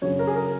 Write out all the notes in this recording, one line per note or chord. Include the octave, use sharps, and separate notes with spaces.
F#2 C#3 F#3 C#5
A#4
G#4
A#4